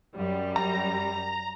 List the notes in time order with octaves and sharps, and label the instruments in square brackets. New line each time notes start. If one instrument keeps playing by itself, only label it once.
[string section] F#2 G3
[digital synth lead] A#5